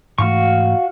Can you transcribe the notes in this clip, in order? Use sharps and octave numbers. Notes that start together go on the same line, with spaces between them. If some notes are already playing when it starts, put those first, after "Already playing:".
G#2 E3 A3 F#4 F5 C#6